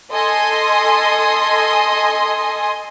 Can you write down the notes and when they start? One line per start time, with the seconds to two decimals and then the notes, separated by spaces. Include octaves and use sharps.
0.13 A4 D#5 G#5 C6 D#6